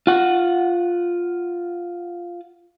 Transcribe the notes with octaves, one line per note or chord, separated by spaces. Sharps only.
F4 F#5